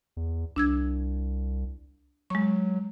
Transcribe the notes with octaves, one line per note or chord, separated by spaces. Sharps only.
E2
C2 D4 E6 G#6
F#3 G#3 C#6